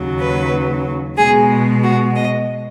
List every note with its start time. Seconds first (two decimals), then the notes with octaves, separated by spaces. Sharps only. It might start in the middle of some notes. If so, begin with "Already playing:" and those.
Already playing: D#2 C#3 F#3
0.20 B4
1.17 B2 G#3 G#4
1.83 F#4
2.15 D#5